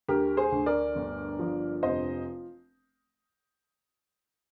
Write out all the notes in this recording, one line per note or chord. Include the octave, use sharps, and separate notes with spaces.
D2 G4 A#4
G#4 C5
D2
A#4 D5
G1
F3
F1 C5 D#5